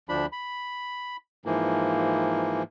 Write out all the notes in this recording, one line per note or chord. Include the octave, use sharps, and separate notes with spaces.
D2 F3 D4 B5
B5
G#2 E3 F3 A#3